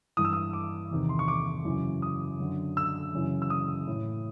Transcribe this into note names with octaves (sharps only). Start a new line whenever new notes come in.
G2 E3 D#6
E6
D#6
D6
E2 C3 D#3
C6
C#6
D6
F#2 C#3 E3
D#6
F#2 D3
E6
F#2 C#3 E3
E6
D#6
A2 E3